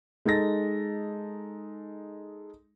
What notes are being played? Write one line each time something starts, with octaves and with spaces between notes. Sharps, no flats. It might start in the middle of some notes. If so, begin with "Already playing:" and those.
G#3 D#4 A4 A6 A#6